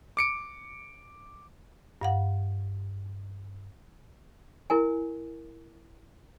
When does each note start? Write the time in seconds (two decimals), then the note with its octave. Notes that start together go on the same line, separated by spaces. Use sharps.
0.17 D6 C#7 D7
2.01 G2 F5 F#5
4.70 E4 A#4 G#5